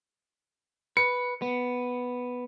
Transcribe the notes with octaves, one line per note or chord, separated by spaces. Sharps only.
B4 C#7
B3